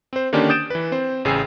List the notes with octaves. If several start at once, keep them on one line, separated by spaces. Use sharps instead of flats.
C4 C5
D3 D#3 A#3 C#4 D4 G4
D#6 G6 A6 D7 E7
E3 B4
C4 C5
A1 C#3 G#4 G5 E6 C7